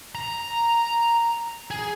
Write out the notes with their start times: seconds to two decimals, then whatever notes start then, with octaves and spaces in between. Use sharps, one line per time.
0.15 A#5
1.71 G#4